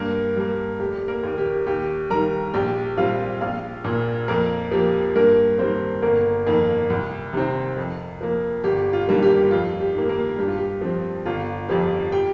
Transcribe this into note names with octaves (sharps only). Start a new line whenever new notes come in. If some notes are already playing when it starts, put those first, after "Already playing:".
Already playing: G2 A#3 A#4
G3 A#3
F1 G4
A#3 A#4
D#2 D#3 A#3
G4
D#2 G4
D#3 G3 A#4 A#5
A#1 G4 G5
A#2 G3 C4 F4 F5
A#1 F4 F5
A#2 A#3
F2 A#3 A#4
F3 A#3 G4
G2 A#3 A#4
D#3 G3 C4 C5
G1 A#3 A#4
F2 D#3 A#3
C2
C3 D#3 C4
F2
F3 A#3
G1 G4
F4
G2 D#3 G3 A#3
G4
F2 F4
G4
D#3 A#3
A#3 A#4
G2 G4
F4
G4
F3 C4
G1 F4
F2 F3 G4
G4 G5